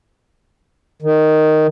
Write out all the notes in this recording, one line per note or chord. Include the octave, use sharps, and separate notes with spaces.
D#3